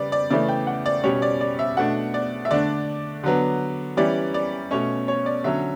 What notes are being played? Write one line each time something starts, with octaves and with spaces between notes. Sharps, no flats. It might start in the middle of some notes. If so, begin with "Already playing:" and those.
Already playing: C#3 G3 B3 D5
D5
C#3 E3 A3 D5
G5
F#5
D5
B2 G3 C#4 C#5
D5
D5
E5
B2 A3 D4 F#5
D5
E5
D3 A3 D4 D5
D3 F#3 B3
E3 G3 C#4 D5
D5
B2 A3 C#4 C#5
C#5
D5
D3 F#3 C#4 E5